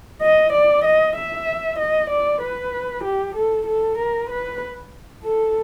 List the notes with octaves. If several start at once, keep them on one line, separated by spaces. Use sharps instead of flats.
D#5
D5
D#5
E5
D#5
D5
B4
G4
A4
A4
A#4
B4
A4